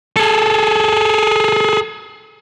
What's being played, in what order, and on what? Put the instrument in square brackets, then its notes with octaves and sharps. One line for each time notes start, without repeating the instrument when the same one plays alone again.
[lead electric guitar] G#4 A4